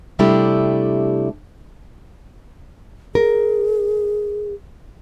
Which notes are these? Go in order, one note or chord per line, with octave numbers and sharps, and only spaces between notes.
C3 G3 A3 D4 E4 G4
G#4 A#4